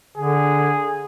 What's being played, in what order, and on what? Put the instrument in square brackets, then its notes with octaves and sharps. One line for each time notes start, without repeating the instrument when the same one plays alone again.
[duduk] D3 [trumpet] G#4